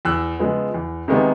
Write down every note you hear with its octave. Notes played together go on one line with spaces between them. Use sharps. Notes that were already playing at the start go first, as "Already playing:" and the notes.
E2 E6 F#6
C#3 F3 G#3 B3
E2
C3 D#3 G#3 B3